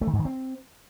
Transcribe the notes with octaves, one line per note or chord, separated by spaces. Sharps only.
A3
D#3
G#2
D#3
C4